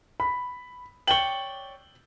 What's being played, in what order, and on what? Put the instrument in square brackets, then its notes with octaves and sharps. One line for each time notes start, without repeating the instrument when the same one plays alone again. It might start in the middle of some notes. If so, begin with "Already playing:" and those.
[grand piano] B5
[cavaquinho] C#5 D5 G5 [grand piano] F#7 G7